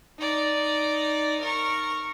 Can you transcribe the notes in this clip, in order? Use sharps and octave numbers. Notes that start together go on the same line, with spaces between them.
D#4 D5
A#4 C#6